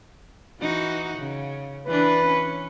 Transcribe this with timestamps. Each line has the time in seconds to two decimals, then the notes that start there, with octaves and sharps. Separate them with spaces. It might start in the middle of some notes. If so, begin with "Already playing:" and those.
0.60 E3 D#4 F#4
1.18 C#3
1.87 E3 D4 B4
2.26 C#4